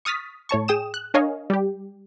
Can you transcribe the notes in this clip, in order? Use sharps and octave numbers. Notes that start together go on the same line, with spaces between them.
C#6 D#6 F6 A6 B6
A2 C#5 A5 C#6
G#4 G5 D#6 E7
F#6
D4 A#4 C#5 D#5 F5 G#5
G3 G4